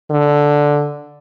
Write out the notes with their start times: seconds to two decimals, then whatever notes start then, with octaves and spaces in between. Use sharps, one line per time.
0.11 D3